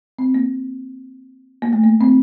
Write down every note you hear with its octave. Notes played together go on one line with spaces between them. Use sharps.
C4
A#3
A#3
A3
A#3
C4